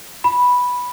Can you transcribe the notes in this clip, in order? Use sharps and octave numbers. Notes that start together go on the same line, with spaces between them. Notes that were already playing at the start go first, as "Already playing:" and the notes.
B5